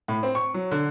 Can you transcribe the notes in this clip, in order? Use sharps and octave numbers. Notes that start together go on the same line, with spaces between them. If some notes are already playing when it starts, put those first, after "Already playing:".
A2
C4
C#6
F#3
D3